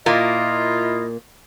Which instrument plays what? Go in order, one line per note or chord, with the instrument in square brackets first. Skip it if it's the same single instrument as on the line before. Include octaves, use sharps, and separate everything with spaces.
[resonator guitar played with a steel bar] A#2 A#3 [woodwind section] E4 F4 D#5